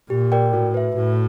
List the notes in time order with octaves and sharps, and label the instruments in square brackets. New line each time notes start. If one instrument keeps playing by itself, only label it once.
[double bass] A#2 [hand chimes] G4
[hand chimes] A#4 D5 G5
[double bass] A2 [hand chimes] F#4
[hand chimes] B4 E5
[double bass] A2 [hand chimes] F#4